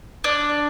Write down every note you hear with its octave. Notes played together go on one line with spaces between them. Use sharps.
D4